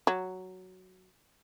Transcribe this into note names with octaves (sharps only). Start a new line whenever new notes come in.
F#3